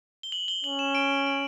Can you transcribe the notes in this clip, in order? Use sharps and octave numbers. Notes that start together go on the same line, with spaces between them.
G7
F#7
G7
C#4 F#7
E7
D7
D7